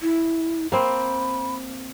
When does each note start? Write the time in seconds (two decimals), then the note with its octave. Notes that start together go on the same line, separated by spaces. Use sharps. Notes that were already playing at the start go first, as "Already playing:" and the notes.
0.01 E4
0.72 A#3 C4 B5